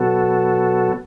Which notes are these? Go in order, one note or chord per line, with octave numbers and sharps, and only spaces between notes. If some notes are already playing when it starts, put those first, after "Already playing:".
Already playing: B2 F#3 B3 F#4 A4